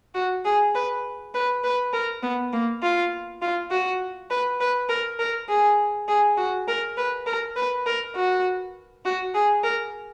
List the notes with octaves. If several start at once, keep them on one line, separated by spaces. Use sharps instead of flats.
F#4
G#4
B4
B4
B4
A#4
B3
A#3
F4
F4
F#4
B4
B4
A#4
A#4
G#4
G#4
F#4
A#4
B4
A#4
B4
A#4
F#4
F#4
G#4
A#4